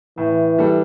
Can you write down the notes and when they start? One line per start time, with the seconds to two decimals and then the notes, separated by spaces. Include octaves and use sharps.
0.18 A2 E3
0.59 G3 D4 A4